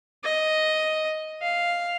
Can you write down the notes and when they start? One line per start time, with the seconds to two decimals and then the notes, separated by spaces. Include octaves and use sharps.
0.24 D#5
1.42 F5